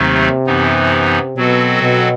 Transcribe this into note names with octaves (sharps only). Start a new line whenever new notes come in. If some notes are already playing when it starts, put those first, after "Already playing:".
Already playing: D#2 C3 D#3 F#3 A3 D#4
F#2 E3 B3 D#4
B2 F#3 C4 F#4 A4
B2